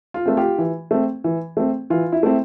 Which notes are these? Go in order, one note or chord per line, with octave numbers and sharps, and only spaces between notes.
F4
A3 C4
F4 G4
E3
A3 C4
E3
A3 C4
E3 F4
E4
A3 C4